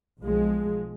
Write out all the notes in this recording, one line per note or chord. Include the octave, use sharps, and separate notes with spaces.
B1 F3 G#3